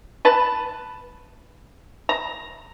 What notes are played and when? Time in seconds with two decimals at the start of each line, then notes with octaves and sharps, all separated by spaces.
0.25 B4 A5
2.09 A#5